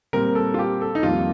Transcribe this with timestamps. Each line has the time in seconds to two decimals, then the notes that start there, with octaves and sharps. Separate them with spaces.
0.13 A#2 G3 C4 A#4
0.35 A4
0.54 F4
0.59 G4
0.81 A4
0.95 D#4
1.03 F2 D#3 G3 A#3 F4